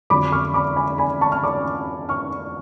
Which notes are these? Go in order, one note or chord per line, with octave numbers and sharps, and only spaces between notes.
F2 D3 F#3 B5 D6
C#6 F6
B5 D6
G#5 B5
G#5 B5
A5 C#6
F6
B5 D6
C#6 F6